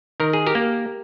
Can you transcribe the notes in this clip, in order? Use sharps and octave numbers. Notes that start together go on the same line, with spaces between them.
D#3 A#4
G#4
G4 A#4
A#3